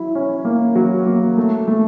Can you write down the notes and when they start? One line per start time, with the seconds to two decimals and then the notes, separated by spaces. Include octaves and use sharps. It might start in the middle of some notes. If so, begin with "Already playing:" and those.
Already playing: F#3 E4
0.15 C#4
0.45 A#3
0.75 F#3
1.06 A#3
1.38 A3
1.68 A3